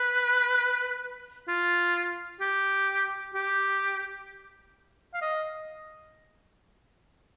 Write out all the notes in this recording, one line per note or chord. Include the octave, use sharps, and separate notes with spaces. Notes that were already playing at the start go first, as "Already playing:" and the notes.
Already playing: B4
F4
G4
G4
F5
D#5